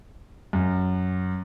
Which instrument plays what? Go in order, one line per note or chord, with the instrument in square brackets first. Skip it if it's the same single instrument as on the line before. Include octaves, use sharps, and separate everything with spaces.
[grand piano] F#2